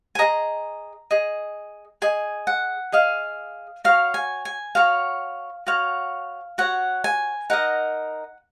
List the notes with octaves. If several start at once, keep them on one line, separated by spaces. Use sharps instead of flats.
G#5
G#4 D#5 A#5
G#4 D#5
G#4 D#5 G#5
F#5
G#4 D#5 F5
F#4 C#5 F5
G#5
G#5
F#4 C#5 F5
F#4 C#5 F5
F#4 C#5 F#5
G#5
D#4 A#4 D#5 F#5